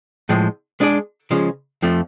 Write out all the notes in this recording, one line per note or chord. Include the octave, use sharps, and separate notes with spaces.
A2 F3 G#3
G#3 D4 G#4 D5
C#3 F3 G#3
F2 F3 A3